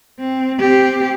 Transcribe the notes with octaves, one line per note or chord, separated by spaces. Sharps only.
C4
C4 G4